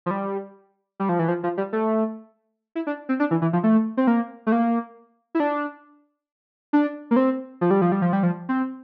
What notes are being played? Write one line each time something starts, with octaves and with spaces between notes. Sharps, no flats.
F3
G3
G3
F3
E3
F3
F3
G3
A3
E4
D4
C4
D4
E3
E3
F3
A3
C4
A#3
A3
A#3
E4
D4
D4
A#3
C4
F3
G3
F3
G3
F3
G3
F3
C4